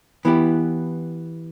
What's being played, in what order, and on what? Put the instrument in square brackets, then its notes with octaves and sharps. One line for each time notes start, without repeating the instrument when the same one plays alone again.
[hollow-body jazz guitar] E3 B3 E4 G4